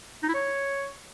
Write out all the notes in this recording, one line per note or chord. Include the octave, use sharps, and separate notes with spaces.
D#4
E4
C#5